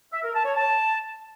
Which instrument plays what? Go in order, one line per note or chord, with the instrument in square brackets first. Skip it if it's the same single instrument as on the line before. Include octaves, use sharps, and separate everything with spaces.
[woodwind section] E5
A#4
A5
C#5
A5